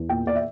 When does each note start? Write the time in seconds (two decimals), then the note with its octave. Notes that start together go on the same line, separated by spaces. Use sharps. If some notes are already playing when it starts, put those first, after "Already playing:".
Already playing: E2
0.09 A#2 G5
0.26 A#2 D5
0.35 E5